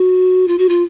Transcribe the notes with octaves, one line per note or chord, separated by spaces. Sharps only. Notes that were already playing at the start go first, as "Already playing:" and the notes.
Already playing: F#4
F4
F#4
F4